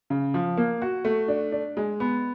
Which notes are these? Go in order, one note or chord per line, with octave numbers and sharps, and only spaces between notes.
C#3
F3
A#3
F#4
A3
D4
D4
G#3
B3